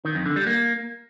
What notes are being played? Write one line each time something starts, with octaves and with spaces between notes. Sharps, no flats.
D#3
F2
D3
G3
A#3